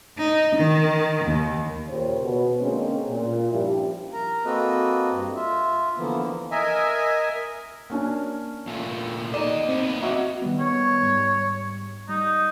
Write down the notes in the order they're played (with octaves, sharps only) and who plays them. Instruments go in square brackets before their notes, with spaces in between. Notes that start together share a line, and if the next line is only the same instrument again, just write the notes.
[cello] D#4
D#3
D#2
[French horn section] A#2 C#3 G4 C5 C#5
B2
D3 G#3 A#3 C4 C#4
A#2
G2 F3 G3 C#4 E4 G4
[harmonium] A#4 A#5
A#3 C4 F#4 A4 B4 D#5
G2
F4 E5
D3 E3 F3 A#3 B3
[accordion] A#4 D#5 E5 G#5
[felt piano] A#3 C#4 D4
[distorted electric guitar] A#2 A3
[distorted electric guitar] A#3 D#5 [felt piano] D#4 E7 [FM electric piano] D5
[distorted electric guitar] D#2 B3 [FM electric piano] C4
[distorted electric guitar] A#3 C#4 [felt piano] F#4 D#5 E5
[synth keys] D#3 G3 B3
[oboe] C#5
[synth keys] G#2 G3 C#6
[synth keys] G3 [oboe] D#4